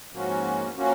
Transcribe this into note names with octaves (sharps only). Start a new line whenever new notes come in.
G#2 F3 A#3 C#4 F#4
F3 A#3 C#4 F#4